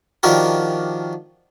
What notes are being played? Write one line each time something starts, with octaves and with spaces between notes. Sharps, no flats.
D#3 F3 D4 F#4 G4 A#4